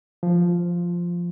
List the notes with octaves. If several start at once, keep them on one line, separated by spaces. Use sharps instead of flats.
F3